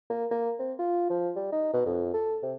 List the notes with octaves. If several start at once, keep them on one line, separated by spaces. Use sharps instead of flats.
A#3
A#3
C4
F4
F3
G3
D#4
B2
F2
A4
C3